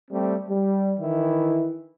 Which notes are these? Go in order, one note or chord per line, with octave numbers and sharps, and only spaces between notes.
G3 A3 C4
G3
D#3 E3 E4